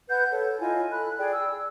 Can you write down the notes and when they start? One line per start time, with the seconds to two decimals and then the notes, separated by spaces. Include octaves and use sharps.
0.09 B4 F#5 G6
0.32 A4 C#5
0.60 E4 F4 D#5 G#5
0.91 A4 B5 F#6
1.18 G#4 D5 G5
1.32 E6